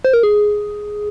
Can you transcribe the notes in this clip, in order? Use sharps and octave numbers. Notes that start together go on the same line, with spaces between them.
C5
A#4
G#4